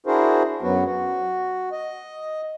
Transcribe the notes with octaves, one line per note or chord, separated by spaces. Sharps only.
D4 E4 F#4 G#4 A#4 C5
F#2 F#3 B3 F#4
F#4
D#5